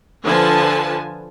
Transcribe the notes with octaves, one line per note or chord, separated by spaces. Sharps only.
D3 F3 B4 G#5 A5